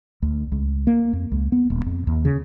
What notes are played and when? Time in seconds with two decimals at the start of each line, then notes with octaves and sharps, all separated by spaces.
0.22 D2
0.52 C#2
0.87 A#3
1.13 F2
1.32 C#2
1.52 B3
1.70 D#1
1.86 F2
2.07 D#2
2.25 C#3